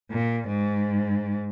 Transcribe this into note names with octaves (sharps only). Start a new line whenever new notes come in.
A#2
G#2